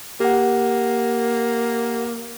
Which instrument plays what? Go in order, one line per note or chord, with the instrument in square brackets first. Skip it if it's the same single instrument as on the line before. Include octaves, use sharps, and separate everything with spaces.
[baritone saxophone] A#3 [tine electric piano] G4 F#5